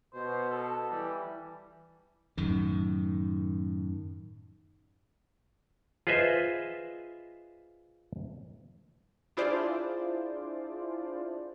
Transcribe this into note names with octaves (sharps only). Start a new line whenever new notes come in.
B2 C5
A4
E3 G3
F#2 A2 D#3
F4 G#4 B4 C5 D#5 E5
D4 E4 F4 G#4 C5 D5